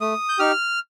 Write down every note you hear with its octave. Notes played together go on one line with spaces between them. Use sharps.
A3 D#6
G6
D#4 G4 F6